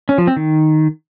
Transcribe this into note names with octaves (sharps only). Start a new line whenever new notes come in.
C#4
F3
C4
D#3